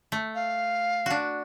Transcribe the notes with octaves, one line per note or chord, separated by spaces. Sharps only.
A3
F5
D4 F#4